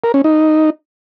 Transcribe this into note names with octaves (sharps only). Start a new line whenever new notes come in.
A#4
C#4
D#4